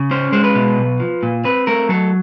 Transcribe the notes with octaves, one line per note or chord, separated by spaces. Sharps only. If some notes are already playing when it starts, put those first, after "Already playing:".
Already playing: C#3
C#4 C5
G#3 C5
B4
B2
B1
F3
A#2
C4 B4
A3 A#4
F#3 A4